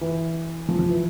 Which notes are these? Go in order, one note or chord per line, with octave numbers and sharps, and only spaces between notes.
E3
F3
F3
E3